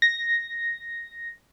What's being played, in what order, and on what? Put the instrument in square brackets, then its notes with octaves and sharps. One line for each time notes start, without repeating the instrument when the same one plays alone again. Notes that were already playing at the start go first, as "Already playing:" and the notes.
[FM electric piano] A#6